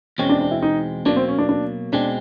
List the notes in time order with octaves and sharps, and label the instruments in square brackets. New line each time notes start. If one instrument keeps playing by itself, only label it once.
[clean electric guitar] E2 B2 G#3 C4 [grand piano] C#4
[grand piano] D4
D4
E4
D#4
[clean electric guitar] B2 F#3 A#3 [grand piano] D4
[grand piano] C4
C#4
D4
D4
[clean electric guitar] B2 G#3 C4 [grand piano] D4